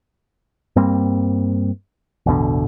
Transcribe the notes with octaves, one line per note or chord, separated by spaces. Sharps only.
G2 G3 A#3 C4
A1 E2 B2 D3